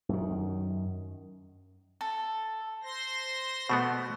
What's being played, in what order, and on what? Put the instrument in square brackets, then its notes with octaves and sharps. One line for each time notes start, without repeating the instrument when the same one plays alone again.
[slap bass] F#2 D#3
[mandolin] A4
[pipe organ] C5 C6 A#6
[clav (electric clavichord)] B2 A3 B3